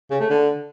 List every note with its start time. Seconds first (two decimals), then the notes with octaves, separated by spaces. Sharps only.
0.11 C#3
0.20 A3
0.30 D3